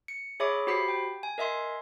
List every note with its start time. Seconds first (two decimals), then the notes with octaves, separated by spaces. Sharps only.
0.08 C#7
0.40 G#4 C#5 E5 B5 D6
0.67 F#4 G4 C5 B5 B6 C7
0.88 G5
1.23 G#5
1.38 A#4 D#5 E5 G#5 C6